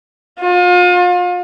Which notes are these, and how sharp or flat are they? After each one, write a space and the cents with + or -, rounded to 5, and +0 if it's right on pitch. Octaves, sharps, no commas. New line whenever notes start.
F4 +35